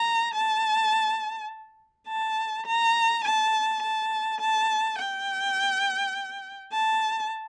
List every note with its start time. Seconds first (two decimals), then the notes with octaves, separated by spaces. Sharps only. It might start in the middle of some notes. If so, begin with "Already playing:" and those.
Already playing: A#5
0.34 A5
2.08 A5
2.67 A#5
3.25 A5
3.82 A5
4.41 A5
4.99 G5
6.72 A5